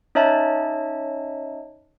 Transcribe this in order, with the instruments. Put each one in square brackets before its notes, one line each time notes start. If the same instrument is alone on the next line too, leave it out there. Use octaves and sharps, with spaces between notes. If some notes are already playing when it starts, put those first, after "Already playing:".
[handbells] C#4 D#4 C#5 D#5 E5 A5